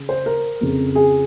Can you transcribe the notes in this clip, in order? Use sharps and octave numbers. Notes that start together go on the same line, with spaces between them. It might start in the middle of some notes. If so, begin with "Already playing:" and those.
Already playing: C#3
C5
A#4
F2 C#3
G#4